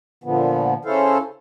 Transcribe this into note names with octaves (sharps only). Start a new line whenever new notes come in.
A#2 D3 F3 B3
C#3 C#4 E4 A4 C5 F5